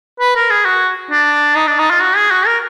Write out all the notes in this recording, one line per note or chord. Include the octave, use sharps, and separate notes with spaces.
B4
A#4
G#4
F#4
D4
D#4
D4
D#4
F4
F#4
G#4
F#4
A#4